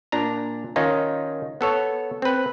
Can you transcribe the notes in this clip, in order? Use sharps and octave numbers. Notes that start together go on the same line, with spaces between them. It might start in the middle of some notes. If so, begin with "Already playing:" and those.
A#2 D4 A#5
D#3 C#4 D#4 F4
B3 A4 C#5
C4 B4